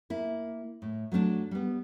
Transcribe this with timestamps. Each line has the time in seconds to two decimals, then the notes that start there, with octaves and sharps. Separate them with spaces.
0.10 A#3 E4
0.82 A2
1.12 F#3 A3 C#4 D4
1.51 G3 B3